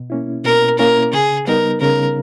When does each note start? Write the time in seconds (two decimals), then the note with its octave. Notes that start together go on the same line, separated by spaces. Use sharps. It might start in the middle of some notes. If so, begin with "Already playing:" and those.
Already playing: B2
0.10 A#3 C#4 E4
0.44 B2 A#4
0.79 A#3 C#4 E4 A#4
1.13 C#3 G#4
1.47 G3 B3 D#4 A#4
1.81 C#3 A#4